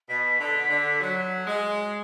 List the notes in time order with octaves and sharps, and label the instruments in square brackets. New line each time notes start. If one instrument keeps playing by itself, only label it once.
[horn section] B2 [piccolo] B6
[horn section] D3
D3
F#3
G#3